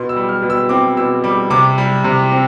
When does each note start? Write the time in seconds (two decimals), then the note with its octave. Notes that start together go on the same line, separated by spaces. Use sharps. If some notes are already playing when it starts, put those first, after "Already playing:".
Already playing: B2 C6
0.09 E6
0.16 G3
0.29 F6
0.42 B2
0.50 E6
0.69 C4 D6
0.97 B2 E6
1.24 G3 D6
1.50 C3 D6
1.78 G3
2.04 C3
2.32 C4